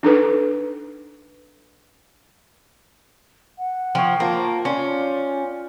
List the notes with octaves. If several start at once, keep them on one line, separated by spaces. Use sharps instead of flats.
D4 D#4 A4 B4
F#5
F3 C#5 G5
A#3 F4 C5 A5
C#4 F4 D5 C6